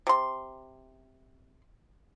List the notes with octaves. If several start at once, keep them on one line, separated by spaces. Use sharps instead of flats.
C3 C6